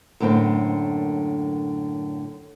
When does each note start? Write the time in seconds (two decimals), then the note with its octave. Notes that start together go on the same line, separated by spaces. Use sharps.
0.20 F#2 A2 D3 A#3 C4